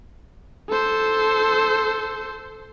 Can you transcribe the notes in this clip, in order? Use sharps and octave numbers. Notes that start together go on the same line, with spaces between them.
A4 C5